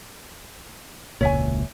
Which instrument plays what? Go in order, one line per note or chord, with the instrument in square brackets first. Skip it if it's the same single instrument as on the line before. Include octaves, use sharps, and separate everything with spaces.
[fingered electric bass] E1 C#2 A#2 [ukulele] C#5 E5 G#5